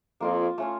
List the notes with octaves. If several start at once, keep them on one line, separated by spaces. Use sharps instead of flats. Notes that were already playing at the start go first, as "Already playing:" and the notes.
F2 A#3 F4 A#4
A3 C#4 F4